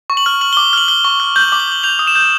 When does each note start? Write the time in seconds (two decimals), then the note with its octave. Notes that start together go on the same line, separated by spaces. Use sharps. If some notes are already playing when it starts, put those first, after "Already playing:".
0.10 C#6
0.17 F#7
0.26 F6
0.41 F6 F#7
0.53 D6 G7
0.73 F6 F#7
0.88 F6 G7
1.05 C#6
1.20 F6
1.36 G6 F#7
1.48 D6 F#7
1.60 G7
1.68 G6 F#7
1.83 G6 F7
1.99 D#6
2.07 E7
2.15 G6